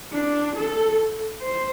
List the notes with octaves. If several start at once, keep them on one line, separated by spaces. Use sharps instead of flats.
D4
A4
C5